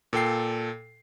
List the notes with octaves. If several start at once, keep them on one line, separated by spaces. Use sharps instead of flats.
A#2 A4 G5 C7